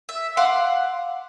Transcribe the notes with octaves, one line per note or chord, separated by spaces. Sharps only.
E5
F5 F#5 C6 D6